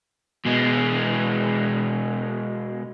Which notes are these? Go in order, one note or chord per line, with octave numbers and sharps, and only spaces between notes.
B2 G#3